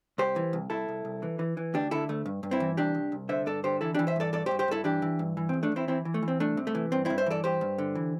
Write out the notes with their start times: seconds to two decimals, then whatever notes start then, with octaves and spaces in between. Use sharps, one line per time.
0.18 C2 G4 C5
0.36 E3
0.53 C2
0.70 C2 E4 A4
0.89 C2
1.05 C2
1.23 E3
1.39 E3
1.57 E3
1.74 D2 D4 G4
1.91 D3 E4 A4
2.09 D2 A3
2.26 G2
2.43 G2
2.51 C4 E4
2.60 E3
2.77 C2 D4 G4
2.94 C2
3.12 C2
3.29 D3 C5 E5
3.46 G2 A4 D5
3.64 D3 G4 C5
3.81 E3 E4 A4
3.95 E3 D4 G4
4.07 C5 E5
4.16 G2 A4 D5
4.33 G2 A4 D5
4.46 G4 C5
4.51 G2
4.59 G4 C5
4.68 G2 E4 A4
4.84 E3 D4 G4
5.02 E3
5.19 G2
5.37 E3
5.49 C4
5.54 E2
5.63 A3 D4
5.72 E2 C4 E4
5.88 E3 C4 E4
6.05 E3
6.14 A3
6.23 E3
6.28 C4
6.40 C2 A3 D4
6.57 C3
6.67 A3
6.75 E3
6.92 G2 C4
7.05 C4 E4
7.10 G2
7.18 C5 E5
7.26 E3 A4 D5
7.44 G2 G4 C5
7.61 G2
7.78 D3
7.95 E3